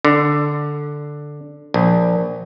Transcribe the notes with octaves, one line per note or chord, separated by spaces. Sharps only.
D3
A#1